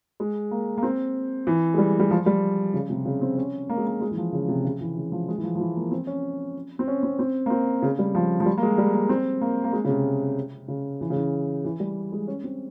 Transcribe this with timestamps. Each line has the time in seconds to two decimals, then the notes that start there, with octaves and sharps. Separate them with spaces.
0.20 G#3
0.51 A#3
0.78 A#3
0.83 C4
1.47 E3
1.74 G#3
1.78 G3
2.00 G3
2.11 F3
2.26 G3
2.74 C#3
2.90 C3
3.05 C#3
3.21 C4
3.37 C#4
3.69 A#3
3.77 G#3
3.87 A#3
4.01 G#3
4.11 E3
4.17 F3
4.32 C#3
4.48 C3
4.64 C#3
4.81 E3
4.97 C#3
5.12 F3
5.28 G#3
5.38 E3
5.44 F3
5.55 F3
5.60 E3
5.76 A#3
5.91 C4
6.07 C#4
6.79 C4
6.88 C#4
7.03 C4
7.19 C4
7.46 A#3
7.50 C4
7.82 C#3
7.99 G3
8.15 F3
8.40 F3
8.46 G3
8.57 A#3
8.63 G#3
8.78 G3
8.94 A#3
9.09 C4
9.41 A#3
9.64 A#3
9.73 G#3
9.85 C#3
9.89 C3
10.68 C#3
11.01 E3
11.10 C#3
11.16 E3
11.65 E3
11.80 G3
12.12 G#3
12.28 C#4
12.43 C4